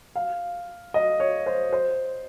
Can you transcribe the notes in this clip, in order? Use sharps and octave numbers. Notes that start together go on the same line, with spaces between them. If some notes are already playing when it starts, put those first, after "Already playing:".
F5
D#5
C#5
C5
C5